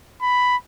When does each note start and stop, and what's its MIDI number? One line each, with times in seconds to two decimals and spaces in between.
0.22 0.56 83